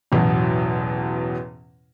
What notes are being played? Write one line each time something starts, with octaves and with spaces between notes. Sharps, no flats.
A1 E2 B2 F#3